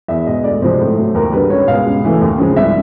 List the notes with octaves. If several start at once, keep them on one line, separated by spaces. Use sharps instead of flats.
E2 E5
B2 G#3 D#5
D2 D5
C3 F3 G#3 C5
A2
F#3 A3
D#2 A#4
D3 G3 B4
C#2 C#5
B2 G#3 F5
C#2
C#3 E3 A3
D#2
C#3 F3 G#3
C2 E5